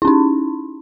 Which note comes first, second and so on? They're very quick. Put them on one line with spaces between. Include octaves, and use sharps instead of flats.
E4 C#4 D#4